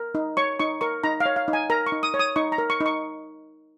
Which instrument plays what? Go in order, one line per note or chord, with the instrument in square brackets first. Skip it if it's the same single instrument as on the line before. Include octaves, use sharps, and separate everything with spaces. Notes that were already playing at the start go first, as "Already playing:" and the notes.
Already playing: [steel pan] A#4
D#4
C#5 C#6
D#4 C#6
A#4 C#6
D#4 A#5
F5
C#5
F5
D#4
G#5
A#4 A#5
C#6
D#4
D#6
C#5
D#6
D#4 C#6
A#5
A#4
C#6
D#4
C#6